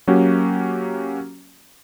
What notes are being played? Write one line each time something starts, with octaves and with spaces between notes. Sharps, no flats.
F#3 A#3 C#4 F#4 G4